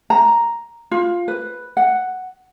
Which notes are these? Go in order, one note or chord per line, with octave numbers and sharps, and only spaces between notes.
A#5
F4
B4
F#5